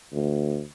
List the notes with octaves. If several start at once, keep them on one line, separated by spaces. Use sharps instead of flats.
D2